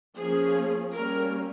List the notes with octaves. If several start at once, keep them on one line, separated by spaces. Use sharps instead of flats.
F3 A#3 C#4 G#4
G3 A#3 C#4 A#4